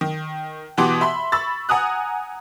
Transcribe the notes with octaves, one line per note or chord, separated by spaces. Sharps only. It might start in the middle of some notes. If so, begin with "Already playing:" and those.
D#3
B2 E3 B3 G4 C6 D6
E5 B5 C6
B5 C#6 E6 A6
F#5 G#5 A#5 D#6 F#6